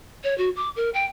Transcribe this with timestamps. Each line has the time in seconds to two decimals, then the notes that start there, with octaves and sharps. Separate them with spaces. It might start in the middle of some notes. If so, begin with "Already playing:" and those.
0.24 C#5
0.38 F#4
0.56 D6
0.76 A#4
0.94 G5